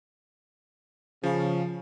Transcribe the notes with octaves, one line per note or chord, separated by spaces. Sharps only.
C#3 F3